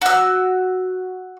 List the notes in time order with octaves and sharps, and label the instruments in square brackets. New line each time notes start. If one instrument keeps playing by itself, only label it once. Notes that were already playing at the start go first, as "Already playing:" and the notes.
[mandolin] F#4 E6